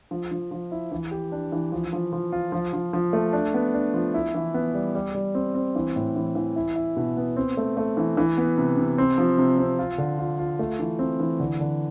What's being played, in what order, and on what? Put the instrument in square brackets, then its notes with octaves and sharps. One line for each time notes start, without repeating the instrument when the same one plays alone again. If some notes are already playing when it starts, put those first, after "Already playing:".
[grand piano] F3
F3
F3
E4
E3
G4
D4
E3
F3
F3
F3
F4
F3
F3
F3
A3
D4
B3
D4
F3
E4
E3
B3
G3
G3
G3
C4
C4
E3
A2
E3
E3
E4
E4
B2
B3
C4
A3
A3
E3
E3
B3
C3
C3
C4
F3
C3
C4
F4
D3
F4
F4
A3
E3
C4
E3
D3
D3